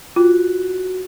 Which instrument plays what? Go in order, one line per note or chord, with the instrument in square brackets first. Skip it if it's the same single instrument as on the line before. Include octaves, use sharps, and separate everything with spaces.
[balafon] F4 [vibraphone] F#4